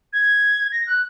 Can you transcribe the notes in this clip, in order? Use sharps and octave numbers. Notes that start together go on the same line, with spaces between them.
G#6
A#6
F#6